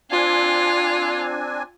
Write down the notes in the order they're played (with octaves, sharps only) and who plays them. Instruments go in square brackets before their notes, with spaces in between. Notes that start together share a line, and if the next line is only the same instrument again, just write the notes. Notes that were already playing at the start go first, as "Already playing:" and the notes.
[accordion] C4 D4 G#5 [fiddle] F4